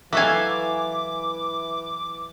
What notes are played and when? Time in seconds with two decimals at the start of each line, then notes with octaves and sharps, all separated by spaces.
0.13 E3 F#3 A4 E5 F5 G#5 D6